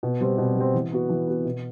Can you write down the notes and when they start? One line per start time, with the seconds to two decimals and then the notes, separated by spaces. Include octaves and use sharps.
0.03 B2
0.21 G3 C4
0.38 B2
0.56 G3
0.61 C4
0.74 E3
0.92 B3 F#4
1.09 E3
1.27 B3 F#4
1.45 B2